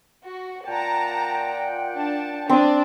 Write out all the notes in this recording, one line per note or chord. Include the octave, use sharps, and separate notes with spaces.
F#4
A#2 F#5 G5 A5 A#5
D4 A5
C4 D4 D5 D#6